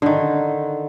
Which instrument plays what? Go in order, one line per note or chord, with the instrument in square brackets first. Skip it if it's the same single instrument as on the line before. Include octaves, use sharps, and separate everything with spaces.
[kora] D3 D#3